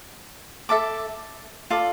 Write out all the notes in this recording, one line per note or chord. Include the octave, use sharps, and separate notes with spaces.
A4 E5 A5 D6
F4 A4 D5